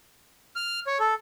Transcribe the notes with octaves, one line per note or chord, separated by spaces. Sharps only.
F6
C#5
A4